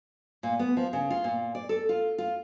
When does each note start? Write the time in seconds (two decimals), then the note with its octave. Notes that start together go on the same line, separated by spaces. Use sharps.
0.43 A#2
0.59 B3
0.77 F3
0.93 C#3
1.10 F4
1.24 A#2
1.55 D5
1.69 A4
1.89 F4
2.18 F4